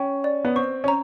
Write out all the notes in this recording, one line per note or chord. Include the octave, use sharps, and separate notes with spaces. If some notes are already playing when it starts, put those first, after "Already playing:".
Already playing: C#4 G5
D5
B3
C4 C#6
C#4
A#5